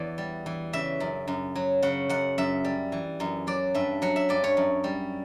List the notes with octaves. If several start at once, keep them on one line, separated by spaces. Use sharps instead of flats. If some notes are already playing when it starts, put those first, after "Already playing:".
Already playing: E2 E3 D5
G3
E3
C#3 E5
F#2
F#2
F#3
C#3 F#5
F#2 F#5
F#2 E5
G3
E3
F#2
F#3 D5
G2 E5
F#3 F#5
E5
G2 D5
C#5
F#2
G3